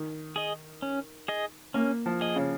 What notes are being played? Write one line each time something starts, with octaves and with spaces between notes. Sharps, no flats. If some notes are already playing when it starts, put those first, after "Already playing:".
Already playing: D#3
G#4 D#5
C#4
G#4 D#5
A#3 C#4
F3
G#4 D#5
C#3